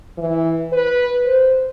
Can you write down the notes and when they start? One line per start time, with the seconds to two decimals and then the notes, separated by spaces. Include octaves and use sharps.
0.18 E3
0.72 B4
1.25 C5